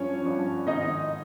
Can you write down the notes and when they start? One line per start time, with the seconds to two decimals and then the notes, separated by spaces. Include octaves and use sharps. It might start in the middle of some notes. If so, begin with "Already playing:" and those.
Already playing: G2 F3 C#4 C#5
0.25 G2 F3
0.67 G#2 D#3 D#4 D#5